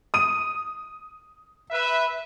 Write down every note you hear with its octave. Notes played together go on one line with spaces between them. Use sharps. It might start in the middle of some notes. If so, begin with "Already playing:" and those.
D#6 D#7
B4 E5